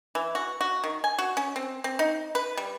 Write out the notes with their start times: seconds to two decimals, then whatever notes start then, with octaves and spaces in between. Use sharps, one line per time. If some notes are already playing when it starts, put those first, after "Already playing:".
0.15 E3
0.35 F#4
0.61 F#4
0.84 D#3
1.04 G#5
1.19 F#4
1.37 C#4
1.56 C4
1.84 C4
1.99 D#4
2.35 B4
2.57 G3